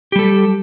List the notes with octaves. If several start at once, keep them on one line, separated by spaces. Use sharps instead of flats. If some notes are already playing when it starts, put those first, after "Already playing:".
G3 G4 A4